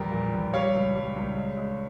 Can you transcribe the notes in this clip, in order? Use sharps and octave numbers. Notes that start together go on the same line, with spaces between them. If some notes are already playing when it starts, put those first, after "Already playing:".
Already playing: A#1 E2 G3 G4 A#4
A#2
A#1
G3 C#5 F5
C#2
G3
C#2
G#3
G#3